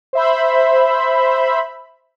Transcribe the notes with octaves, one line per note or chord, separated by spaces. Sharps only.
C5 E5 B5